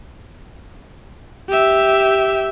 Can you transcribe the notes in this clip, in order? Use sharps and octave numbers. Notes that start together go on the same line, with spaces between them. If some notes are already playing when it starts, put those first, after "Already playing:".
G4 E5